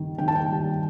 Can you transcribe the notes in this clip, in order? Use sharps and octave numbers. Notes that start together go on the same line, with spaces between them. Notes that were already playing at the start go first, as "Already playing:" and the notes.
Already playing: D#3 G3
D#3 G5
A5
G5
G3